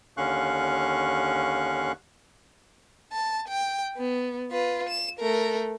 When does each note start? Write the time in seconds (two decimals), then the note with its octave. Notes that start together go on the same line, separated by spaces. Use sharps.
0.17 D#2 D3 C#4 F5 C#6 F#6
3.12 A5
3.48 G5
3.97 B3
4.51 F4 B4
4.89 E7
5.20 A3 A#4